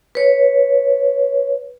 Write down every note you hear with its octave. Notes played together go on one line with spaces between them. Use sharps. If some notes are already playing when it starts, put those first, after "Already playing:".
B4 C#5